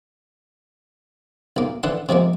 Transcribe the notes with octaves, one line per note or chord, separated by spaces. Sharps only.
B1 A#3
D3 E3 F#5 C6
C3 F3 G#3 A#3